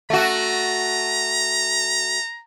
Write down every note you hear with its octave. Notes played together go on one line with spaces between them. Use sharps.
A3 F#4 A#5